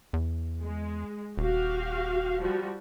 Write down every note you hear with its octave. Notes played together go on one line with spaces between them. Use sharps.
E2
G#3
D#1 F#4 G4 F5
F3 G3 F#4